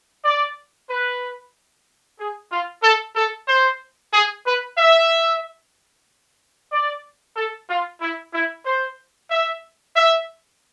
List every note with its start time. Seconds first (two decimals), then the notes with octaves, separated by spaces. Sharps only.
0.25 D5
0.90 B4
2.19 G#4
2.52 F4
2.83 A4
3.16 A4
3.48 C5
4.13 G#4
4.46 B4
4.78 E5
6.72 D5
7.36 A4
7.69 F4
8.01 E4
8.33 E4
8.66 C5
9.31 E5
9.96 E5